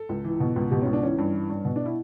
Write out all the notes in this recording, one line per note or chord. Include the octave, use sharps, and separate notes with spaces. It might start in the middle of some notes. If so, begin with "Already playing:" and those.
Already playing: A4
C#2
E3
B2
C#2
B2 G4
C#4
C#2
D4
E3 C#4
G2
E3
G2
B2
D4
E4